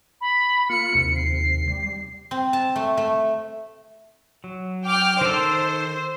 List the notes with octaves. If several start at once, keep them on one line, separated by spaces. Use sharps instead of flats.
B5
A#3 F4 C#7
D#2 C3
C7
G3
C4
A5
A3
A3
F#3
G5 D6 F6
D#3 A4 C5